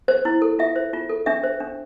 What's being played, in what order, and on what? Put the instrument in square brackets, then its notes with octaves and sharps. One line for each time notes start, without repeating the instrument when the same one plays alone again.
[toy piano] C5
E4
A4
F4 E5
C5
F4
A4
D4 E5
C5
D4